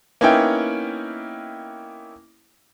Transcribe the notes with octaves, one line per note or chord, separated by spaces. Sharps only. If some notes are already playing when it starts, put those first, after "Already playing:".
A#3 B3 C#4 D#4 E4 G5